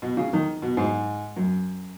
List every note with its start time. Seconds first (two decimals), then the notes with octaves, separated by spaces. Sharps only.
0.02 B2
0.17 C#3
0.33 D#3
0.62 B2
0.77 G#2
1.36 F#2